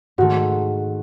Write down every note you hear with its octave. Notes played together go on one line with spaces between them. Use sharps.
G#2 D#3 A3 F#4